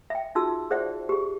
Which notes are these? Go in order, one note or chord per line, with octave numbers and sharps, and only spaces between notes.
E5 G5
D#4 F4 F#4 G#4 A5 E6
G#4 C5 D5 E5 F#5
G4 G#4